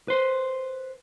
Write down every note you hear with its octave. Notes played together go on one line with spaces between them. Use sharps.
B4 C5